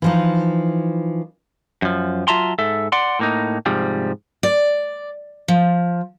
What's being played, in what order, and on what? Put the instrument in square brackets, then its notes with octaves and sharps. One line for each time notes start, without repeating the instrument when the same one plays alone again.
[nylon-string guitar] E3 F3 D#4
[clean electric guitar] F#2 F3
F#3 F4 E5 A5 A#5 C6
G#2 A4 E5
D5 F#5 C6
A2 A#3 D#4
G#2 C3 F3 G3
[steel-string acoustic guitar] D5
F3